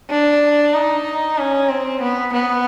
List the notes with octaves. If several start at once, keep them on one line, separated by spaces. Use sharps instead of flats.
D4
D#4
C#4
C4
B3
B3